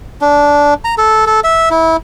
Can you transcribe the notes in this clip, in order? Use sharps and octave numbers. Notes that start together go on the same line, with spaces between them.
D4
A#5
A4
A4
E5
E4